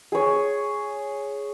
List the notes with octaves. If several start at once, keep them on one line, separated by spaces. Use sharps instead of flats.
G#4 C#5